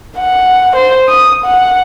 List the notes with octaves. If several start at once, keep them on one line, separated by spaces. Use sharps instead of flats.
F#5
C5
D#6
F#5